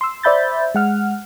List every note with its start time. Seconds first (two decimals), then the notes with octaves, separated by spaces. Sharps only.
0.01 C6 E6
0.23 C5 D5 E5 B5 G6 A6
0.75 G#3 F#5 F6